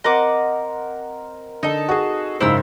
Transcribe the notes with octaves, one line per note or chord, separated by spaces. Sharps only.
C4 A#4 D#5 F#5 C6 D6
D3 D#4 A4
F#4 G#4
F#1 G#2 E4 F4 C5 E6